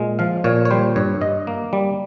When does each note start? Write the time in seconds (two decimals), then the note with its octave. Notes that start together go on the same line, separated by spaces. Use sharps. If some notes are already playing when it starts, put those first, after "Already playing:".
Already playing: A#2 G#3
0.19 F3 F5
0.44 A#2 C#5
0.65 C#5
0.71 G3 C5
0.96 G2 C#5
1.21 G2 D#5
1.47 A#3
1.73 G3